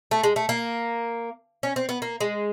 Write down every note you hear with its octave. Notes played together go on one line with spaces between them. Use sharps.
A3
G#3
A3
A#3
C#4
C4
B3
A#3
G#3